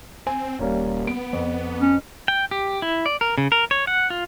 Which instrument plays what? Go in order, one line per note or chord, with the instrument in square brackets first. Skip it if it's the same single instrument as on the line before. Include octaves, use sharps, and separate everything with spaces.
[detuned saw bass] C4 [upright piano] G#5
[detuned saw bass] D#1 [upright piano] G3 A#3 C#4
[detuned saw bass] B3 [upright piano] D7
[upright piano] F2
[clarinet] C#4
[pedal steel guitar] G5
G4
E4
D5
A#4
C#3
A#4
C#5
F#5
F4